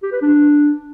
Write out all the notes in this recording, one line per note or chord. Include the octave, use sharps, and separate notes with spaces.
G4
B4
D4